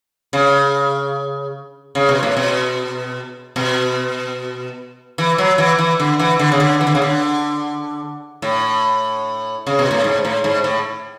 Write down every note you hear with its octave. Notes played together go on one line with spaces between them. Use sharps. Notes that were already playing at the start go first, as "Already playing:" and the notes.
C#3
C#3
B2
A2
B2
B2
E3
F#3
E3
E3
D3
E3
D3
C#3
D3
E3
D3
C#3
D3
A2
C#3
B2
A2
G#2
A2
G#2
A2